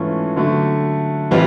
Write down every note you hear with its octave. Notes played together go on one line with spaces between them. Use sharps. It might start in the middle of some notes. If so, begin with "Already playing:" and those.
Already playing: G#2 E3 A3 C#4 F4
D3 F#3 A3
A2 E3 G3 C4 F4